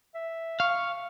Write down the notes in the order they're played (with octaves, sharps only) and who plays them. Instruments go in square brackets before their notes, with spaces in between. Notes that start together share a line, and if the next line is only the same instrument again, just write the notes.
[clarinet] E5
[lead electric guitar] F5 [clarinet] C#6